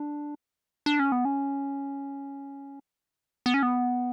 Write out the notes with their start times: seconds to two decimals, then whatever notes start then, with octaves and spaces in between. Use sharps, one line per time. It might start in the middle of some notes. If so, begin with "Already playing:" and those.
Already playing: D4
0.86 D4
1.00 C#4
1.12 B3
1.25 C#4
3.46 B3
3.54 C#4
3.63 B3